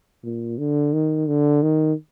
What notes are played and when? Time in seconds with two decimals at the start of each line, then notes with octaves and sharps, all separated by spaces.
0.24 A#2
0.58 D3
0.93 D#3
1.28 D3
1.63 D#3